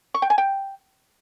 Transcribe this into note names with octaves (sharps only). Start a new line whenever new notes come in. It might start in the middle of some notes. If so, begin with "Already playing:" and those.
C#6
G5
G#5
G5